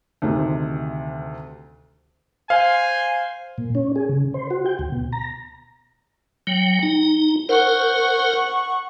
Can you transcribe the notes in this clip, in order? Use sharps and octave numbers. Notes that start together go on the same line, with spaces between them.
D2 C3 D#3
C5 F5 G#5
A#2
C#4
G#4
C#3
C5
F#4
G5
D2
B2
A#5
F#3 G5
D#4
A#4 C5 F#5 C#6